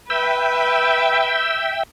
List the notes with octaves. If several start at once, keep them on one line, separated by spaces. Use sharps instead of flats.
B4 E5 G5